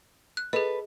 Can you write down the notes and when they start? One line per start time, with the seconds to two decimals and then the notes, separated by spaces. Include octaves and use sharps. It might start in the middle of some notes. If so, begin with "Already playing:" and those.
0.37 F#6
0.53 G#4 A4 B4 D#5